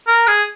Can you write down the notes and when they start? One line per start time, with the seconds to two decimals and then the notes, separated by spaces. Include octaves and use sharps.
0.08 A#4
0.27 G#4